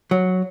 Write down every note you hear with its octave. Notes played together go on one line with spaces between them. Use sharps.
F#3